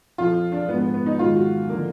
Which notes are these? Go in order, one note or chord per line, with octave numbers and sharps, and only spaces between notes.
F2 F3 F4
D4
G#2 F3 B3
B3
B3
D#4
G#2 D#3 F#3 F4
F#4
D3 F3 A#3